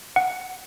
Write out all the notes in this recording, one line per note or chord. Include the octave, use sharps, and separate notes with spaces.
F#5